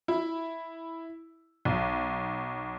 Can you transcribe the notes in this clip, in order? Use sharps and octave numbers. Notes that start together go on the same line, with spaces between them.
E4
B1